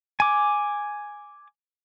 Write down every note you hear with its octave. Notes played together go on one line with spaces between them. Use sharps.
G#5 D6